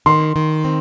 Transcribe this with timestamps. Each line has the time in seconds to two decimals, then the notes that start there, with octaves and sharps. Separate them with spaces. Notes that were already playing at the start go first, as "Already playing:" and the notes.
0.06 D#3 C6
0.36 D#3
0.65 C4